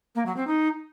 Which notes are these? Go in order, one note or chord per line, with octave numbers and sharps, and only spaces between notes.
A#3
F#3
C4
D#4